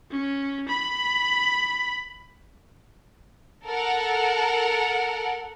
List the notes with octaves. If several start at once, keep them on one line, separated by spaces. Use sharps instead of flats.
C#4
B5
A4 A#4 F#5